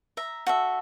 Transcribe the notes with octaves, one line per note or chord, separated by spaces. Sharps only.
E5 A#5
F#4 A4 E5